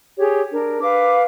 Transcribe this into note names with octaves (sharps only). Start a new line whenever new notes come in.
G4 G#4 C#5
D4 A#4
B4 F5 D6